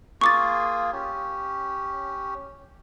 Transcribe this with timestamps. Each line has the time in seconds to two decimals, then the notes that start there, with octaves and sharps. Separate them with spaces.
0.21 A#3 F4 G#4 C#6 D6 A6
0.93 C#4 G4